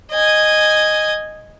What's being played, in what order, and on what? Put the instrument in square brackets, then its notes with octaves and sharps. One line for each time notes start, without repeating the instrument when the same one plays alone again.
[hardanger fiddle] D#5 G#5